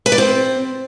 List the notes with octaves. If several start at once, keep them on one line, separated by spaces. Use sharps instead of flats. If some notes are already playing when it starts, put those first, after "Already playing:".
B4
D5
C4